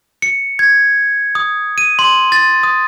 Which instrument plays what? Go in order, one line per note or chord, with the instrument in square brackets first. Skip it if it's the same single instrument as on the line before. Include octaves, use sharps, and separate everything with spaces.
[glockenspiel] C#7
G#6
D#6
D#7
C6
A6
D#6